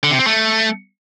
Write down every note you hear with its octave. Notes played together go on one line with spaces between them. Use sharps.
D3
C3
C4
A3